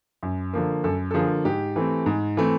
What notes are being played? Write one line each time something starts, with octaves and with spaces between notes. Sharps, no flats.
F#2
D3 F3 A#3
F#2 A4
A4
D3 F3 A#3 G#4
G#2 G4
E3 A3 C4
G#2
E3 A3 C4